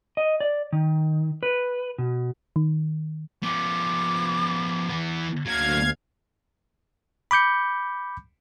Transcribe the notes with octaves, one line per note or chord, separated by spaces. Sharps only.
D#5
D5
D#3
B4
B2
D#3
F3 B3 D6
E3 B3
D2 F#3 A#3 F5 G#6
B5 D6 G6 C#7